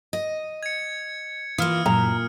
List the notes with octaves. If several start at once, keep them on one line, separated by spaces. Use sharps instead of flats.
D#5
G#6 C#7
E3 A#3 F4 D#6 F6
F#2 A#2 A#5